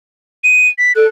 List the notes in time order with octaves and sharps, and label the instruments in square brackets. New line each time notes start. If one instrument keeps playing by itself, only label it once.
[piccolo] D#7
B6
[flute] A4 [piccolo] F#6